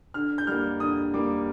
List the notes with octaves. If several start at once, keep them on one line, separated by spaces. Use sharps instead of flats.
D3 F6
G6
G3 A#3 F6
D3 D#6
G3 A#3 D6